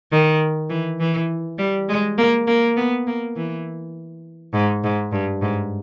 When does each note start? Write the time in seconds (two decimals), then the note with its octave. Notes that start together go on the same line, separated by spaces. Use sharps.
0.12 D#3
0.70 E3
1.00 E3
1.58 G3
1.89 G#3
2.18 A#3
2.47 A#3
2.77 B3
3.07 A#3
3.36 E3
4.54 G#2
4.84 G#2
5.12 G2
5.42 G#2